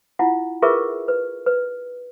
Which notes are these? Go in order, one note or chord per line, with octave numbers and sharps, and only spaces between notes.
E4 F4 F#5
F4 G#4 A#4 B4 E5 C#6
B4
B4